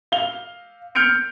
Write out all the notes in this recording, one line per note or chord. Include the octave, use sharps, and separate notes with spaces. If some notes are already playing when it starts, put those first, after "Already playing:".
F5 F7 G7
F6 G6 C#7 D7 F7